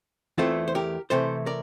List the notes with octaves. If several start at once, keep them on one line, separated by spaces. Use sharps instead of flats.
E2 E3 A3 C4 E4 F4 A4
C5
G4 A#4
C3 E3 A3 A4 C5
A#4 D5